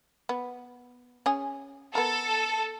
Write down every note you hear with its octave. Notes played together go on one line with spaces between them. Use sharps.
B3
C#4 G#4
B3 A4 A#4